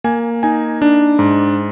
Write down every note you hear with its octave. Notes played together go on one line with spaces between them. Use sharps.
A#3 G#5
D#4 G#5
D4
G#2